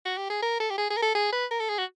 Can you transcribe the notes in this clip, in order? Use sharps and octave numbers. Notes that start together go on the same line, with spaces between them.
F#4
G4
G#4
A#4
A4
G4
G#4
G#4
A#4
A4
G#4
B4
A#4
A4
G#4
F#4